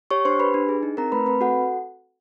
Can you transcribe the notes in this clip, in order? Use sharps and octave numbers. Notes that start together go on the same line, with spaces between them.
G4 C#5 C#6
D4 C5 C6
G4 B4 B5
D4
G#4
D#4
C4 A#4 A#5
A3 B4 B5
C4 B4 B5
F#4 A4 F#5